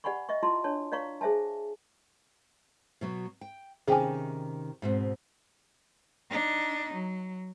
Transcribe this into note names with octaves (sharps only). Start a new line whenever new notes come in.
G4 D5 F#5 G#5 B5 C#6
D#5 E5 C#6
E4 F4 A5 A#5 C6
D4 C#5 A5
C#5 D5 F5 A#5 C#6
G#4 C5 E5 G#5 A5
B2 F#3 B3
G5
C3 D#3 C#4 G#4 G5 G#5
G#2 B2 C4
D4 D#4
F#3